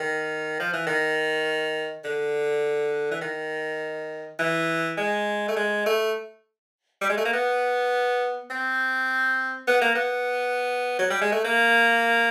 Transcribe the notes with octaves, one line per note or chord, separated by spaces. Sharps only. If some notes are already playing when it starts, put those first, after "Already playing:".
Already playing: D#3
F3
E3
D#3
D3
E3
D#3
E3
G#3
A3
G#3
A3
G3
G#3
A3
A#3
B3
C4
B3
A#3
B3
F#3
G3
G#3
A3
A#3